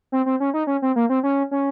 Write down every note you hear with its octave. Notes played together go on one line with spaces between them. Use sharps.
C4
C4
C#4
D#4
C#4
C4
A#3
C4
C#4
C#4